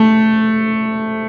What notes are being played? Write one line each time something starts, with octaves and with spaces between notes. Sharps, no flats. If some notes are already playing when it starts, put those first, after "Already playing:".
Already playing: A3